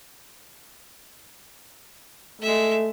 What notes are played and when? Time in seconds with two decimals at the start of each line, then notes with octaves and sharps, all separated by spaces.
2.42 G#3 A3 E5